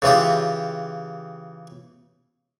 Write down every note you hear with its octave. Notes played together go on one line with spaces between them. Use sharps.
C#3 E3 F4 G4